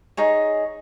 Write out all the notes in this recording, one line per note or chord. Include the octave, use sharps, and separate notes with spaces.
D#4 G#4 C#5